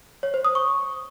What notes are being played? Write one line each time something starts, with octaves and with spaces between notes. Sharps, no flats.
C#5
C5
D#6
C#6